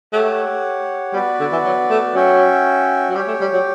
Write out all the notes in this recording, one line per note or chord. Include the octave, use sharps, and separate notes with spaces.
A3 G4 C#5 F#5
G3 B3 F#4 B4 D5
D3
E3
F#3
A3
F#3 C#4 F#4 C#5 E5 G5
F#3
G3 G4 C#5 G5
A3
G3
F#3